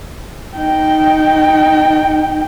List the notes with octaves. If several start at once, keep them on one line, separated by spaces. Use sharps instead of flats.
D#4 G5